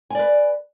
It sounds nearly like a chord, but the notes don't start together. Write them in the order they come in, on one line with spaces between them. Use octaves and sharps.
G#5 D5 B4